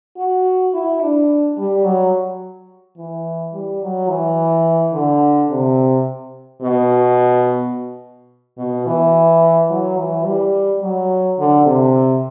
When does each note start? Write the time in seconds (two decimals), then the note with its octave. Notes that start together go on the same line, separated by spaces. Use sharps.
0.17 F#4
0.74 E4
1.01 D4
1.57 G3
1.84 F#3
2.97 E3
3.53 G3
3.82 F#3
4.09 E3
4.93 D3
5.49 C3
6.62 B2
8.57 B2
8.86 E3
9.70 F#3
9.97 E3
10.25 G3
10.81 F#3
11.38 D3
11.65 C3